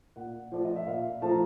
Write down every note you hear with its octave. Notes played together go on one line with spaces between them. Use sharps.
A#2 F#5
F3 A3 D5
D#5
E5
A#2 F5
F3 A3 A5
A#5